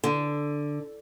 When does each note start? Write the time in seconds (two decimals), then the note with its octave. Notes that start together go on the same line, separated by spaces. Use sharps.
0.04 D3